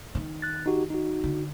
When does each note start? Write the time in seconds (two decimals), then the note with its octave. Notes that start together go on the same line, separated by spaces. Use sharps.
0.15 D#3
0.42 F#6 A6
0.66 D#4 F#4 G4
0.90 D#4 F#4
1.24 D3